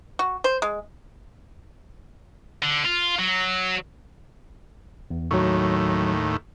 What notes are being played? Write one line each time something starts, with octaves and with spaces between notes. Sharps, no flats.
F#4
C5
G#3
D3
F4
F#3
E2
D#2 A2 F#3 C#6